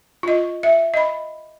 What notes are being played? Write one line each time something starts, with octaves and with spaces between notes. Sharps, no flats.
F4 D#5
E5
D#5 B5